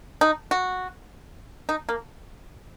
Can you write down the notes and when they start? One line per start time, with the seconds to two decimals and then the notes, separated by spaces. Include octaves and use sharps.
0.21 D#4
0.51 F#4
1.69 D#4
1.89 A#3